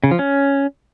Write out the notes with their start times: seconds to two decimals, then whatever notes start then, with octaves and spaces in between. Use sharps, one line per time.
0.04 C#3
0.11 F3
0.19 C#4